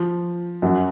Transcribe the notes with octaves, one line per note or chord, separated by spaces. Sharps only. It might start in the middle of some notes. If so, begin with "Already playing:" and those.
Already playing: F3
F#2 F#3